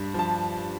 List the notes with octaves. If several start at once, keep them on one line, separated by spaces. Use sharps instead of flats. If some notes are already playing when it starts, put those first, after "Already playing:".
Already playing: G2
F3 A5